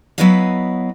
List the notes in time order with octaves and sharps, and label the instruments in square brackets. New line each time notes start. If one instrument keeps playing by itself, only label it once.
[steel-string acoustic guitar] F#3 B3 E4 B4 D#5 F5